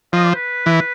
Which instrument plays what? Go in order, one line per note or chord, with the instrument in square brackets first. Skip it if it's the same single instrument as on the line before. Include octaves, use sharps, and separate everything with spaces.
[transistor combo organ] F3 [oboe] D#5
[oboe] D5
C5
B4
[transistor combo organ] E3